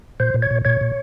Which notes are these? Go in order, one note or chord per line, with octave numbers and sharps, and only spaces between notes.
A#2 C5
A#2
C#5
A#2
A#2 C#5
A#2